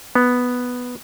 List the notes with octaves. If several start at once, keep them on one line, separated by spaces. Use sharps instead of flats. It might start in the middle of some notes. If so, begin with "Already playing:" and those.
B3